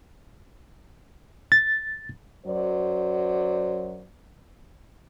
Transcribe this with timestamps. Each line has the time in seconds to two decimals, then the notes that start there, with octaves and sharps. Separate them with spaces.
1.52 A6
2.45 F#2 F#3 C5 D5